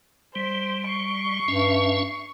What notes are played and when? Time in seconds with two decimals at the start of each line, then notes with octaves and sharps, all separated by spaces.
0.35 G3 C5 B6
0.89 C#6 C7
1.48 G2 C#4 E5